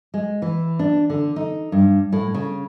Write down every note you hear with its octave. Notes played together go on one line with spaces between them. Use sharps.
G#3
E3
D4
D3
D#4
G2
A2
C#3